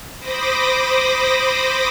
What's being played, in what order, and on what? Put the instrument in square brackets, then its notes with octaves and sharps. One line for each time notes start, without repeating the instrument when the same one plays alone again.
[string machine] C5 B5 D6 D#6 A#6